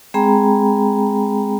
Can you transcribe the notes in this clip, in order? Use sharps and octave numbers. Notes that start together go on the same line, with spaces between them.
G#3 C4 G#4 G5 A#5 B5